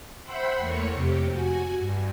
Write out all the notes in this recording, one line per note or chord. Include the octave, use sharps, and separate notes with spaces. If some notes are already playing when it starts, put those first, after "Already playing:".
C5 E5 F#5 G5 B5 C6
E2 A3 A#3 C#5 C#7
F2 C3 G4
F#4 G#5
G2